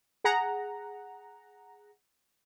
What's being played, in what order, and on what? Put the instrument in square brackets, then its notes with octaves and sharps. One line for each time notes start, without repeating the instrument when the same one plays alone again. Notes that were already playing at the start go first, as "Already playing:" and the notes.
[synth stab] G#4 F#5 A#5